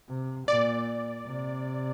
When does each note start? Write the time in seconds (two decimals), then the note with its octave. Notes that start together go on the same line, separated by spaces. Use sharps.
0.09 C3
0.48 A#2 D5
1.26 C3